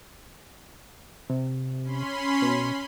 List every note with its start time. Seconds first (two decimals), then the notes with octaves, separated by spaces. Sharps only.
1.30 C3
1.84 C#4 B5 C6
2.42 B2